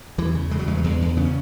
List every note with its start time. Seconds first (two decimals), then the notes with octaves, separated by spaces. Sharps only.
0.18 E2 E3
0.35 C#3
0.51 C#3 G#3
0.59 F#3
0.67 E2 G#3
0.78 F#3
0.84 E2 G#3
1.01 E2
1.17 C#3 B3
1.25 C#4